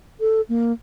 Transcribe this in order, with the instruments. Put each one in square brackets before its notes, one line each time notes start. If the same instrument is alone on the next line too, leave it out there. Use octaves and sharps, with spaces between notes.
[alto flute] A4
A#3